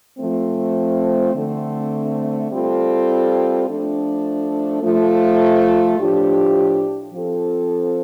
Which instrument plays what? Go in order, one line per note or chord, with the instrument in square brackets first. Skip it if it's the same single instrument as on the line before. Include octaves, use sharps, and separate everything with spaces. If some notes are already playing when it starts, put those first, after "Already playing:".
[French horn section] F3 A3 C4
D3 A3 C4
G3 C4 F4 A4
F3 A3 D4 A4
F3 A3 F4
A2 F3 D4 G4
F3 C4 A4